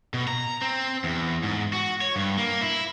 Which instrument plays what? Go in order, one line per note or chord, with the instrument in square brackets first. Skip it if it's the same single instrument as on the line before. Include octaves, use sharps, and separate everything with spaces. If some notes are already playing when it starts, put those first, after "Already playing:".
[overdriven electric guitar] B2
A#5
C4
E2
G#2
F#4
C#5
G2
A#3
E4